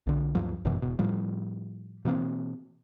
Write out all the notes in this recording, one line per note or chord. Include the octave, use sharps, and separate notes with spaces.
B1 D3
D2 G2 F3 F#3
G1 F#2 B2 E3
E1 B2
A2 F3 G3
B2 E3 A#3 C4